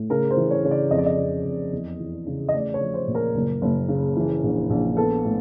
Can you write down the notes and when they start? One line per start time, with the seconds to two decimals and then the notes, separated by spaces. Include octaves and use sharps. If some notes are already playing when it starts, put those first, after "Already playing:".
Already playing: A2
0.10 C#3 A#4
0.30 C5
0.37 E3
0.51 C#5
0.64 C#3 C#5
0.71 D5
0.91 F2 D#5
0.98 D5
1.06 D#5
1.18 F2
1.45 F2
1.72 E2
2.00 E3
2.27 C#3
2.49 D#5
2.54 A3 D5
2.74 C#5
2.80 F3
2.94 C5
3.07 A#2
3.15 A#4
3.35 F#1
3.62 F#1
3.88 C#3
4.17 E3
4.43 A#1
4.70 A#1
4.97 B3 A4
5.24 A2